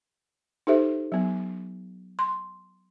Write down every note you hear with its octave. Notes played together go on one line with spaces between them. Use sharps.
D#4 G4 A4 C5 E5
F#3 B3
C6